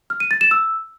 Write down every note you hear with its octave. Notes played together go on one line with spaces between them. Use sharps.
F6
D#7
A6
E7
E6